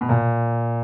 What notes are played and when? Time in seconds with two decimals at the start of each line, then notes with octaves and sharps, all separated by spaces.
0.01 B2
0.09 A#2